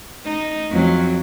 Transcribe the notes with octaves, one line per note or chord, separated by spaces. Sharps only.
D#4
F2 F#3